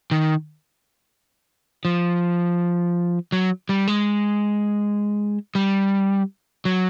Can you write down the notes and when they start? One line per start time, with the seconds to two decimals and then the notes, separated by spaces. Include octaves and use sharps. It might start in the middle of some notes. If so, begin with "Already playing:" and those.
0.11 D#3
1.85 F3
3.32 F#3
3.69 G3
3.88 G#3
5.55 G3
6.65 F#3